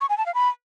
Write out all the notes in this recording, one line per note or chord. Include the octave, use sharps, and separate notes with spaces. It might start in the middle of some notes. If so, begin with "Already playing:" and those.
C#6
G#5
A5
F5
B5